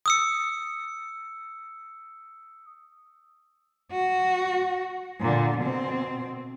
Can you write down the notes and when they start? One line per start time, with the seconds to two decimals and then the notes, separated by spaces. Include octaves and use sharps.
0.06 D#6 E6 C#7
3.91 F#4
5.21 A#2 D3
5.58 B2 C4